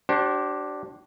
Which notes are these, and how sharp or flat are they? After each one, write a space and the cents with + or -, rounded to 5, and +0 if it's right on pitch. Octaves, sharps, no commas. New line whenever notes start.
D4 +0 G4 -45 C5 +35